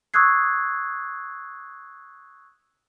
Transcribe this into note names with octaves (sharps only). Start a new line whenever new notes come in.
C#6 D#6 E6 F#6 G#6 C7